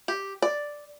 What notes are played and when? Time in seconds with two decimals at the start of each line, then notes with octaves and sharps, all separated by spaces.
0.08 G4
0.42 D5